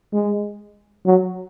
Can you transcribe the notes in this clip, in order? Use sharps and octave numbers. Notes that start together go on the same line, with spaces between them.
G#3
F#3